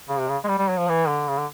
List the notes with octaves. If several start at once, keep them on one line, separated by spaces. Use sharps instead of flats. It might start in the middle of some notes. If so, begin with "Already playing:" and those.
C#3
C3
C#3
G#3
G3
G3
F#3
F3
E3
D3
C#3
D3